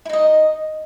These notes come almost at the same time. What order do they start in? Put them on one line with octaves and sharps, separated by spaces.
E4 D#4 D#5